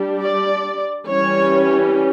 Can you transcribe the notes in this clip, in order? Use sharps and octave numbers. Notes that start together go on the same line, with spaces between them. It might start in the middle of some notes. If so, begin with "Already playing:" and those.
Already playing: G3 D4
D5
E3 G3 C#4 C#5